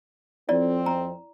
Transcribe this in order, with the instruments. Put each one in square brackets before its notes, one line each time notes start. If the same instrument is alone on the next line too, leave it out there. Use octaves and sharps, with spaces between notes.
[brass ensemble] F2 C4 [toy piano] E4 D5
[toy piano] A#5